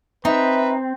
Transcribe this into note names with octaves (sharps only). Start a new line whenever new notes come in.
C4 D#4 B4 E5